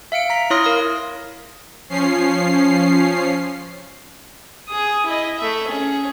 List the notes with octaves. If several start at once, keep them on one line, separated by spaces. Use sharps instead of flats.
E5 F5 C#7 D7
A#5 B6
E4 C#5 C6 D#6 F6 A#6
A#4 F5 D#6
F3 C#4 C7
G#4 D#6
E4 D#5
A3 E5
C#4 G#4